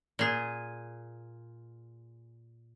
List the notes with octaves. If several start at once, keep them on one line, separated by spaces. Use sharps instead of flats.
A#2 G#4